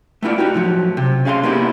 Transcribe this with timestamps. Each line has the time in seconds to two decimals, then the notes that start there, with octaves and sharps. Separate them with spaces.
0.22 A3 B3 E4 F4 D5
0.38 D#4 F#4 G4
0.54 A2 F3 F#3
0.97 C3
1.25 C#4 G#4 F5 A5 C6
1.43 A#3 B3 D#4 E4 G4